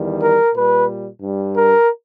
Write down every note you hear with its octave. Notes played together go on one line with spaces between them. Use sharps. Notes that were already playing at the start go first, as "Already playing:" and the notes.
Already playing: E2 D#3 G3
A#4
A#2 G3 B4
G2 G3
A#4